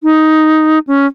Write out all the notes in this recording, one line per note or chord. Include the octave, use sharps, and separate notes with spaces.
D#4
C#4